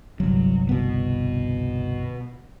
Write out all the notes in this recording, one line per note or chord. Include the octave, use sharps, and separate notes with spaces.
G1 C2 F#3
B2 B3